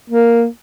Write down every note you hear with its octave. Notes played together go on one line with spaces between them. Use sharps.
A#3